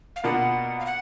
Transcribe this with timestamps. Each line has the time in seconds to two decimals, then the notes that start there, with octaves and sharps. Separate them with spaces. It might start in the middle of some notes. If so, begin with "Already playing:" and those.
0.16 F5
0.23 B2 A#3 D4 F4 A#4 F#5
0.80 F5
0.86 F#5